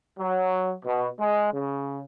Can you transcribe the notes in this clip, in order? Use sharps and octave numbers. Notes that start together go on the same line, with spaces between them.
F#3
B2
G#3
C#3